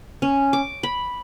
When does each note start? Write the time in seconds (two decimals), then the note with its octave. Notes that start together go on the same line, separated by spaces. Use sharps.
0.22 C#4
0.53 D6
0.83 B5